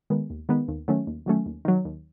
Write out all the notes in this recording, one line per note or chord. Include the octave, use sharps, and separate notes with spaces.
D#3 G#3 B3
D#2
D#3 G#3 B3
D#2
D#3 F#3 A3 C#4
D#2
D#3 F#3 A3 C#4
D#2
D#3 F#3
D#2